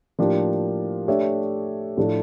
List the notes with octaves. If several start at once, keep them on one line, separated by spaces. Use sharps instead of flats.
A2 F3 A#3 D4 G4
A3 D4 G4 C#5 E5
A2 F3 A3 D4 A4